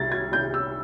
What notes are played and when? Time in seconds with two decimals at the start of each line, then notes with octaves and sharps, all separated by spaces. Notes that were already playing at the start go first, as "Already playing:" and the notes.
Already playing: C2 G#6 A6
0.12 G#6
0.32 C2 G6
0.54 E6